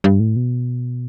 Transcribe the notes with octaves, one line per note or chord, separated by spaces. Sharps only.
G2
A2
B2